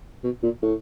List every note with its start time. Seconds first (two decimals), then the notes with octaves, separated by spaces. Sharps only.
0.24 B2
0.43 A#2
0.62 A2